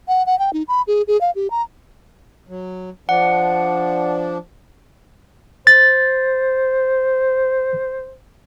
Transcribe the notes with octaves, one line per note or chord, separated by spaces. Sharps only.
F#5
F#5
G5
D#4
B5
G#4
G#4
F5
G4
A#5
F#3
F3 D4 F#5
C5 A6